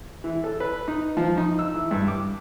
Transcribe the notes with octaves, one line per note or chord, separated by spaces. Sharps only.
E3
A4
B4
D#4
F3
D#4
E6
E3
G2
D6